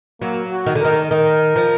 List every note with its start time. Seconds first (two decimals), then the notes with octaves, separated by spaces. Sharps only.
0.21 F#3 A#3
0.52 F#4
0.66 D#3
0.75 D3
0.81 D#3 A#4
1.11 D#3 A#4
1.56 F3